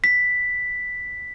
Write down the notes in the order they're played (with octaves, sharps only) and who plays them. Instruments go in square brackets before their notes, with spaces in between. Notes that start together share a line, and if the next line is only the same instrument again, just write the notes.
[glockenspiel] B6